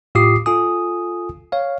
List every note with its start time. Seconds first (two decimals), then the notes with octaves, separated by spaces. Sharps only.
0.15 A2 F4 G4 D6 D#6 C7
0.46 F4 A4 G#5 D#6
1.52 C#5 F5